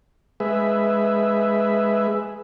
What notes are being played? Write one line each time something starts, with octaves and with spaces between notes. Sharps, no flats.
G#3 G#4 B4 E5